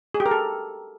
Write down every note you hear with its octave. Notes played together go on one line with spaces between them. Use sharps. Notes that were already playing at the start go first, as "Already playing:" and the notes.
G#4
G4
A#4
A4